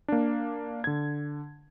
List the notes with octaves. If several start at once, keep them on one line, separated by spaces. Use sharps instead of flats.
A#3 D4
D3 G#6